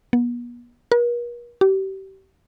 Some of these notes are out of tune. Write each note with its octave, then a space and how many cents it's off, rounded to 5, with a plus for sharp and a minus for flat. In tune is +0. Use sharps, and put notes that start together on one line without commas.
B3 -40
A#4 +45
G4 -30